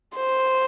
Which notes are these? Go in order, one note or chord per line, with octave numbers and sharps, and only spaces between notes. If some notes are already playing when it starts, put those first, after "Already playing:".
C5